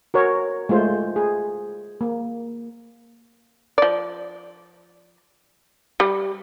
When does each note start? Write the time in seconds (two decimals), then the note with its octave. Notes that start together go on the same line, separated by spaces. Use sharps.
0.14 F#4 A#4 C#5
0.69 G#3 A3 F4 C5
1.16 G#4
2.01 A#3
3.78 F3 D5
6.00 G3